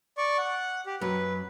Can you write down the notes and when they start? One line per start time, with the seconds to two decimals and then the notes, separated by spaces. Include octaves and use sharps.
0.18 D5 C#6
0.38 F#5
0.86 G4
1.01 F#2 F#3 B4